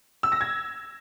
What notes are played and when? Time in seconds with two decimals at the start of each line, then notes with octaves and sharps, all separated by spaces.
0.23 E6
0.32 A#6
0.41 G#6